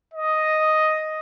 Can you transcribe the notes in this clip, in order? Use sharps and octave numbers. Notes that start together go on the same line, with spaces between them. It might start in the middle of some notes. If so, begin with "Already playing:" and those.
D#5